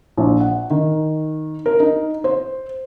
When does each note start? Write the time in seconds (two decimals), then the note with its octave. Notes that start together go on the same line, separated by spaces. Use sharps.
0.17 A#1
0.40 F#5
0.70 D#3
1.66 A#4
1.80 D#4
2.24 C5